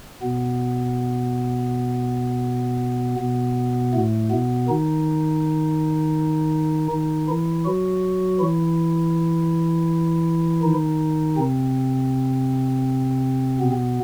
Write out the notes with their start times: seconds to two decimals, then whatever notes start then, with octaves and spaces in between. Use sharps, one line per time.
0.22 B2 B3
3.19 B2 B3
3.94 A2 A3
4.30 B2 B3
4.68 D#3 D#4
6.91 D#3 D#4
7.28 E3 E4
7.65 F#3 F#4
8.40 E3 E4
10.63 D#3 D#4
11.37 C3 C4
13.60 B2 B3